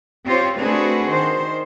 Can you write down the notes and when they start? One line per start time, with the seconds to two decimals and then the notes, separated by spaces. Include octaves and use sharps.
0.25 C4 F4 G4 C5 C#5
0.57 A3 C4 D4 F#4 G#4 B4
1.09 D#3 C5